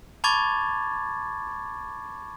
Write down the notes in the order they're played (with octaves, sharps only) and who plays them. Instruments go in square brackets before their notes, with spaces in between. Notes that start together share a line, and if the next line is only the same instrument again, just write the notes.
[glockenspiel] A5 B5 C#6 D6 G#6 A6